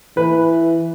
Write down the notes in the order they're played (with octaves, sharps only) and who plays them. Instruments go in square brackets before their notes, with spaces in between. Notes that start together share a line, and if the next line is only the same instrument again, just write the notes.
[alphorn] E3 [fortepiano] B4